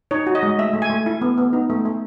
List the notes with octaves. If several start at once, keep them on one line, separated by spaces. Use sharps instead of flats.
D#4 C#5
F#4
D#5
G#3
A3 E5
A3
G#5
A3
E4
B3
B3
D#4
A3
A3